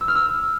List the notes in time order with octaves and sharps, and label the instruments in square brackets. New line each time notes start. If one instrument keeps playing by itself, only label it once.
[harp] E6
F6
E6